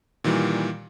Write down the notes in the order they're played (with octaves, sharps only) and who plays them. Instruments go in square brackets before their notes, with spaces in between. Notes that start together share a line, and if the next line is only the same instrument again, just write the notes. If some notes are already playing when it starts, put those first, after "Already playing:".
[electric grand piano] A#2 D#3 E3 G3